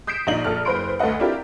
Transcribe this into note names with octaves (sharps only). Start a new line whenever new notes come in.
D#6 G6 B6 C7 D7 E7
A#1 D#4 F#7
A#1 A4 F6
F#1 B4 C5 B5 C6 D7
D2 A4 B4 D#5 F#5
C4 D4 E4 F4 G4 A#4